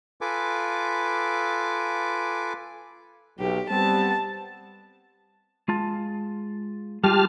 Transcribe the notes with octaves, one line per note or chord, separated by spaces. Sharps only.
F4 A4 B4 G#5 D6
B1 G4
G3 B3 C4 A5
G#3 F4 A5
G3 G#3 F4 G4 A5 F6